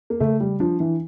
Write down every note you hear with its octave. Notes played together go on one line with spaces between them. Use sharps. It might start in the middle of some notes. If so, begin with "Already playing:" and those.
A#3
C#3 A3
G3
F3 D4
E3